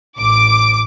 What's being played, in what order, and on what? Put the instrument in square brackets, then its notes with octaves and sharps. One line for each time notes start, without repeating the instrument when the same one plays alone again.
[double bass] A1 [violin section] D6 D7